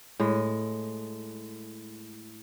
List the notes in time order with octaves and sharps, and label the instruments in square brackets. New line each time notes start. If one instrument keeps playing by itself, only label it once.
[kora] A2 G#3